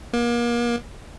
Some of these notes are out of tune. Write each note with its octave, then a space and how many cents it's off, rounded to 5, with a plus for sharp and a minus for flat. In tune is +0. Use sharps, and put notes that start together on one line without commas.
A#3 +35